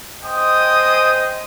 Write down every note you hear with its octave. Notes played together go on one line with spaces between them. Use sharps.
C5 D#5 G5 G#5 D#6